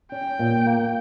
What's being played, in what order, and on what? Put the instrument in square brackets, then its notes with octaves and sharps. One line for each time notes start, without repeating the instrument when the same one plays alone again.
[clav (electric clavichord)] C#4 [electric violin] G5
[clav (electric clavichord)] A#2
A#3